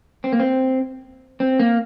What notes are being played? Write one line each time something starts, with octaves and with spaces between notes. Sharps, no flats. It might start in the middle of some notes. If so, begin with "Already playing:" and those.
C4
A#3
C4
C4
A#3